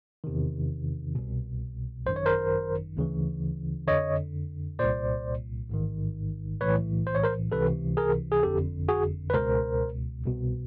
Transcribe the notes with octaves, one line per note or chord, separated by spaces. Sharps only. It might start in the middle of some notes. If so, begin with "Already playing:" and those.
E2 C3 D#3
C2 B2
G#1 F#2 D#3 C5
C#5
A#4 C5
D2 C#3 E3
F2 D3 C#5 D#5
C2 A#2 C5 D5
A1 G#2 D#3
B1 A2 E3 B4 C#5
C5
C#5
A#4 C5
C#2 C3 E3 A4 B4
G#4 A#4
G#4
G1 F2 D3 G4 A4
F#4 G#4
B4
C#2 B2 A#4 C5
C2 B2